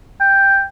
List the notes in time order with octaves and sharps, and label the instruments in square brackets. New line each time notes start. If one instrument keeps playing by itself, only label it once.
[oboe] G5